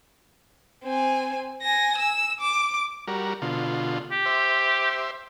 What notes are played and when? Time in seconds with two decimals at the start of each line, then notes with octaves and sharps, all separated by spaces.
0.84 C4 G#5
1.62 G#5 A#6
1.98 E6
2.41 D6
3.07 G3 F#4 A#4
3.42 B2 D3 F4
4.11 G4
4.25 C5 E5